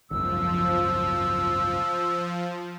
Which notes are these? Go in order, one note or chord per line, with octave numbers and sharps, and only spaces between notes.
G#1 C#2 F#2 F3 E6